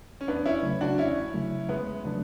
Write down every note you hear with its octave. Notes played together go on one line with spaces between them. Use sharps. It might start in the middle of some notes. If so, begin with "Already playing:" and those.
C#4
E2 B3 D4
C#4 E4
C#3 F#3 A3
D4 F#4
E2 C#4 E4
C#3 F#3 A3
E2 G#3 B3
C#3 F#3 A3 B3 D4